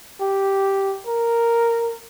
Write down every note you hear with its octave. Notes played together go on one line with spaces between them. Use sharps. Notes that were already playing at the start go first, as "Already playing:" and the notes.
G4
A#4